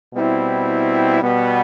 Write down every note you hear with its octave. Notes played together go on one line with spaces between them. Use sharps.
B2 G3 C4 E4
B2 G3 B3